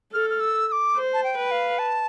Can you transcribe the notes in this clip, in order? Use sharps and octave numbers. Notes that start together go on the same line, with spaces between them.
A4 F6
F6
E6
E6
D6
C5
A5
G5
B4
F5
A5